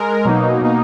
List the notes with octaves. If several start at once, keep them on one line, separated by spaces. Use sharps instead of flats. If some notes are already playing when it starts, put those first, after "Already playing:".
Already playing: G#3 A#4
B2 F#3 A#3 D#4
B2 A#3 D#4